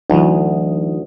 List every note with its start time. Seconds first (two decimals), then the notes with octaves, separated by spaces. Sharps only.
0.10 D2 E3 F#3 D#4